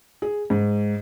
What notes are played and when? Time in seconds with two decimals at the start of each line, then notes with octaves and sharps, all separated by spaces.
0.22 G#4
0.50 G#2